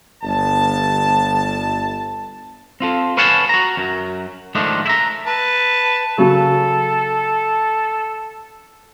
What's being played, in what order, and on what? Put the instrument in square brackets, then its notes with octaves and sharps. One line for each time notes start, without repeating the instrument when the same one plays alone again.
[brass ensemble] G1 A5
[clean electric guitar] C4 F4 A4
B4 C#5 F5 F#5 G#5 A5
F#4 A#5
F#2 F#3
G#2 D#3 F3 A3 D4 D#4
E4 E5 A#5
[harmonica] B4 A5
[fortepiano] C#3 F#3 [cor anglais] A4